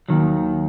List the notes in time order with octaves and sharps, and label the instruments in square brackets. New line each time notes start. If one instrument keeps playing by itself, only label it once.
[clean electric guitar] D#2 D#3 F#3